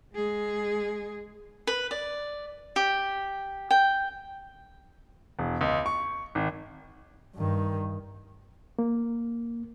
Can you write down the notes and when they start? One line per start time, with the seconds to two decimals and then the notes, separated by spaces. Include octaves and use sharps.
0.13 G#3 G#4
1.67 B4
1.91 D5
2.76 G4
3.71 G5
5.39 E1
5.61 C#2
5.86 C#6
6.35 G#1
7.36 G2 D#3
8.79 A#3